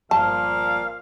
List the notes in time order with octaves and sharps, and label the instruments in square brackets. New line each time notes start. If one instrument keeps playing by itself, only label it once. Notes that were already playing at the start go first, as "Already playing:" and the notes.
[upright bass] G1 F4 [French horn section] A#2 F3 [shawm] F5 [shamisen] A5